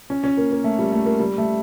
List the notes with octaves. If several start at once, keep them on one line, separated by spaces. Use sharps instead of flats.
C#4
C#4
A#3
A#3
A3
G3
A3
A#3
G3
A3